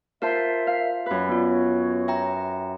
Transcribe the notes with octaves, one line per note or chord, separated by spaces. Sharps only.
F4 A#4 C5 E5 A5
F5
F#2 B4
B3 F4 D5
C#5
E5 G5 A#5